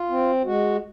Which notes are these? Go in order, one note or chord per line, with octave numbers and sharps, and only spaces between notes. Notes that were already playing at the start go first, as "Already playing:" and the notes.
Already playing: F4
C4
G#3 F#4